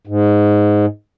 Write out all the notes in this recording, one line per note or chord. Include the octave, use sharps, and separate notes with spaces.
G#2